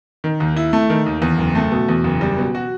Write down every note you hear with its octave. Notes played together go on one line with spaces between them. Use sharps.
D#3
D#2
E4
A3
D#3
D#2
E2
F#1
A3
B2
E2
F#1
G3
B2
F#4